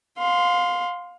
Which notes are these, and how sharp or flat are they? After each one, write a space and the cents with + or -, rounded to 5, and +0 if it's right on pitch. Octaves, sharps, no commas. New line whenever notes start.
F5 +25 C6 -10